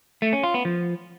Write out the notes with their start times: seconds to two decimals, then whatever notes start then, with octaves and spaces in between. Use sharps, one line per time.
0.22 A3
0.33 C#4
0.44 F4
0.54 B3
0.65 F3